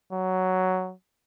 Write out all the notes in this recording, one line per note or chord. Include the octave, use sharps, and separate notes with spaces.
F#3